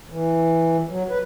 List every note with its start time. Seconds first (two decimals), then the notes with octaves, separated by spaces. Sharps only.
0.10 E3
0.90 F#3
1.09 B4